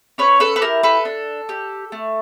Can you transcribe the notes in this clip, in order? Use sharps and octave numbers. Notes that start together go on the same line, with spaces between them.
C#4 B4 C#5
A4 B4
B4
E4 G4 A#4
A4 B4
D4
G4
A3